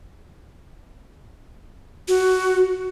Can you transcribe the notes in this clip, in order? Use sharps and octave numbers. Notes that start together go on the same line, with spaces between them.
F#4